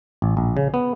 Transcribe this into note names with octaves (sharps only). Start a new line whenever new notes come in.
A1
A#1
C#3
B3